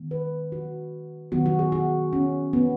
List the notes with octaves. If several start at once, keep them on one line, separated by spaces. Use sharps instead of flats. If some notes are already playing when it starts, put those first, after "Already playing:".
Already playing: D#3 G#3 B3
B4
F#4
D#3 F#3 B3 F#4
F#4
G#4
F#4
C#4
B3